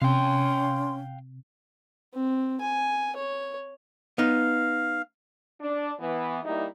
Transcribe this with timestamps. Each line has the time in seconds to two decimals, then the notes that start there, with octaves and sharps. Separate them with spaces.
0.02 C3 C#4 F5 G5 C6
2.13 C4
2.60 G#5
3.16 C#5
4.18 B3 D#4 F5
5.61 D4
6.00 E3 B3
6.44 G3 A#3 D#4 E4